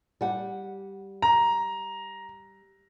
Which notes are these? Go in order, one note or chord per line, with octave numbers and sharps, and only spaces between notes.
G3 F#5
A#5